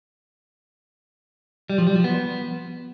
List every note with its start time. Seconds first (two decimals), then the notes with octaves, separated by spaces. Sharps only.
1.70 G3
1.78 F3
1.87 G3
1.96 F3
2.04 B3